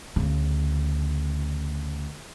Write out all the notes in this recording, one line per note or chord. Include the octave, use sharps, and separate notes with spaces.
D2 C#3